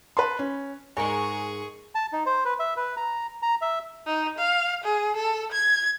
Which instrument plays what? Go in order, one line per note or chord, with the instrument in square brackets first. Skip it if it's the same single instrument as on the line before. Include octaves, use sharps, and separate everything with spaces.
[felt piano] B4 A5 C6
C#4
[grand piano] G#2 [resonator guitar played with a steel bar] G#3 A#4 C#5 [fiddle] G#4 C#6 [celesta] G#5
[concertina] A5
D#4
C5
B4
E5
B4
A#5
A#5
E5
[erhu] D#4
F5
G#4
A4
G#6